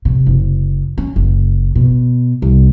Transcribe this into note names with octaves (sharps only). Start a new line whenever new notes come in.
C3
F#1
C#4
F#1
B2
C2